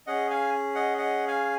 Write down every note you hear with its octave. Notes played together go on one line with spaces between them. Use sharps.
C#4 G#4 D#5 F#5
F5 G#5
D#5 F#5
D#5 F#5
F5 G#5